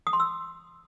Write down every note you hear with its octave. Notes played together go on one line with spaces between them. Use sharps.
D#6
C6
E6